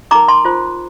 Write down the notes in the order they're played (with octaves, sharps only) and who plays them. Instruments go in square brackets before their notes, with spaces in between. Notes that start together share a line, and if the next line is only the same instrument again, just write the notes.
[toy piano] D#4 A#4 A#5 D6
A5 C6
F4 C5